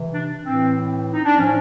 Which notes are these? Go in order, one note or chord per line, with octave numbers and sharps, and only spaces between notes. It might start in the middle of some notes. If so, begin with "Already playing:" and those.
Already playing: C3 E3
D4
A2 E3 C4
D#4
D4
A2 F3 C#4